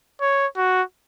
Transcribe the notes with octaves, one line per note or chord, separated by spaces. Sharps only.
C#5
F#4